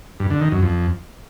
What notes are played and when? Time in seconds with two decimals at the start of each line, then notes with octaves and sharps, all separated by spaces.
0.20 G2
0.30 D3
0.41 D#3
0.52 F#2
0.62 F2